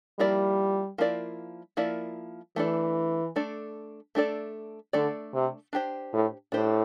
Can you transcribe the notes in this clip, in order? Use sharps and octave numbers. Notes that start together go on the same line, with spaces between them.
F3 G3 A#3 E4 A#4 D5
F3 A#3 E4 A#4 D5
F3 A#3 E4 A#4 D5
E3 A3 D4 A4 D5
A3 D4 A4 D5
A3 D4 A4 D5
D3 A3 D4 A4 D5
C3
D4 G4 C5
A2
A2 D4 G4 C5